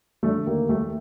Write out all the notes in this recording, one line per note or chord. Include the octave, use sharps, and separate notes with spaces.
D3 A3
D#2 A#3
D#2 A3